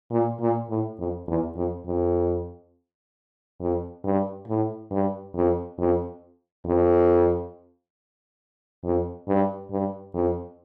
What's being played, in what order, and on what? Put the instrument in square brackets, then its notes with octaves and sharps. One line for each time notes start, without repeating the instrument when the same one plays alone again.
[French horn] A#2
A#2
A2
F2
E2
F2
F2
F2
G2
A2
G2
F2
F2
F2
F2
G2
G2
F2